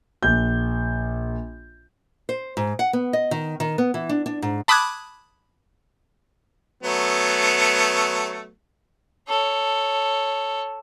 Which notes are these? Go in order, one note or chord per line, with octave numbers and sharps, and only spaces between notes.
A#1 G6
C5
G#2
F#5
B3
D#5
D#3
D#3
B3
E3
D4
D4
G#2
A5 B5 D6 D#6 F#6 G#6
F#3 A3 B3
A4 C#5